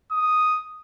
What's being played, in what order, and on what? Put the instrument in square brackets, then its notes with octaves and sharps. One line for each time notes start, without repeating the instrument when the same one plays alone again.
[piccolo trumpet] D#6